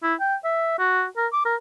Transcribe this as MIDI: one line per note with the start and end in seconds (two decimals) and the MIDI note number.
0.03 0.14 64
0.20 0.35 79
0.44 0.78 76
0.79 1.05 66
1.17 1.27 70
1.33 1.41 86
1.45 1.55 70